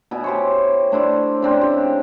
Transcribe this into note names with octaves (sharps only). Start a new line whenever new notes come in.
B2 E4 G#5
G4 C5 C#5
A3 D4 E4 C5
C#3 C4 D4
G4